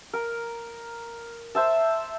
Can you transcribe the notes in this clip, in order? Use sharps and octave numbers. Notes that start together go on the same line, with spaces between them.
A#4
C5 E5 A5